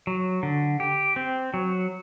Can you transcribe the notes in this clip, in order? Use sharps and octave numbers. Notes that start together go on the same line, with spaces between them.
F#3
D3
G4
C4
F#3